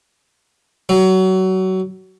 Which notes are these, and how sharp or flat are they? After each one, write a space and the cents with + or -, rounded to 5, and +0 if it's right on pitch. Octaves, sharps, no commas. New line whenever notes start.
F#3 +25